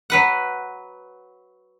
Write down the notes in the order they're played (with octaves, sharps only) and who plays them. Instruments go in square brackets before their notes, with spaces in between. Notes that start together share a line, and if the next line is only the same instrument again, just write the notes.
[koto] F#3 B4 F#5